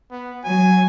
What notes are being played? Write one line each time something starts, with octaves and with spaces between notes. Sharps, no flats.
B3
F#3 G#5